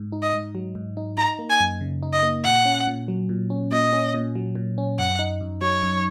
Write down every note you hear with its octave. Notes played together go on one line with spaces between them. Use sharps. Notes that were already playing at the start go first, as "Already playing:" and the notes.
Already playing: G#2
D#4
D#5
G#2
F#3
G#2
D#4
D#4 A#5
A#3
G#5
F#2
C#3
D#4
D#5
A#3
A#2 F#5
C#4
A#2
F#3
A#2
C#4
A#2 D#5
C#4
A#2
F#3
A#2
C#4
F#2 F#5
D#4
F#2
F#3 C#5
F#2